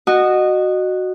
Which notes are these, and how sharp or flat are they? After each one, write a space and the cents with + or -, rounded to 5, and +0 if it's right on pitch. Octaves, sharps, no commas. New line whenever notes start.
F#4 +0 D#5 -20